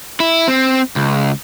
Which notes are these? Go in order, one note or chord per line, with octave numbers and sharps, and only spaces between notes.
E4
C4
C#2